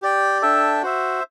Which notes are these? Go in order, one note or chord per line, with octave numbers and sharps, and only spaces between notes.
G4 D5 G5
D4 A4 E5 G5
F#4 C5 E5